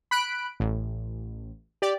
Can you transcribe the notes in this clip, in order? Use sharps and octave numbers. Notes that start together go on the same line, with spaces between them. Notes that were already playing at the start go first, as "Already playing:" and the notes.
B5 F#6 D7
A1
G4 D5